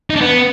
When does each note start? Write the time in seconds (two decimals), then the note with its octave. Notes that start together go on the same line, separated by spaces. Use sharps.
0.10 D#4
0.16 D4
0.21 B3